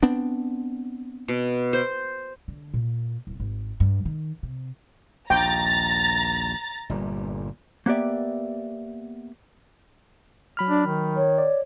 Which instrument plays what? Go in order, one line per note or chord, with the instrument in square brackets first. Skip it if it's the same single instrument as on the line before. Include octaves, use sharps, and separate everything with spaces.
[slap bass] B3 C4 D4
[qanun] B2
C5
[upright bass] D3
A#2
D1
G#1
G2
D#3
C3
[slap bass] A#1 D#2 [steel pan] G5 [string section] A#5 A6
[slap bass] G1 A#2 G3
[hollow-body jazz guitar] A#3 B3 G4 D5 E5
[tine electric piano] F#3 B5 F6
[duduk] D4
D#3
[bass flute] C#5
[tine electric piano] D5